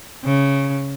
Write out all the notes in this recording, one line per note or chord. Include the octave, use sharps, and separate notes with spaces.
C#3